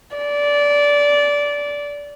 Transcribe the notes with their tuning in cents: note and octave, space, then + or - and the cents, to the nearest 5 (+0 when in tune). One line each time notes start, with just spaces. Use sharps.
D5 -20